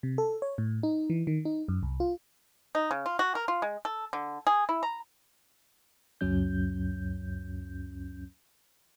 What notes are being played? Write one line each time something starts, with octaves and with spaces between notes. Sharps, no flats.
C3
A4
C#5
A2
D#4
E3
D#3
D#4
F#2
C2
F4
D#4
C#3
F4
F#4
A#4
F4
G#3
A4
D3
G#4
E4
A#5
C#2 F#2 F#3 C#4 G6